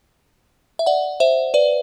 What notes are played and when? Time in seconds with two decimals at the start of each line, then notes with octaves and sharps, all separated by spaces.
0.79 E5
0.86 D5 F#5
1.20 C5 E5
1.54 B4 D5